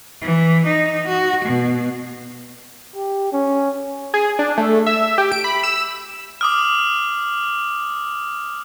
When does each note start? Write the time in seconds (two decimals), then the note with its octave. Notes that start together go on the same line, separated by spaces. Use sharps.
0.21 E3
0.67 D#4
1.08 F#4
1.45 B2
2.96 G4
3.33 C#4
4.14 G#4
4.39 D4
4.57 A3
4.86 E5
5.18 G4
5.32 D7
5.44 B5
5.63 E6
6.41 D6 D#6 F6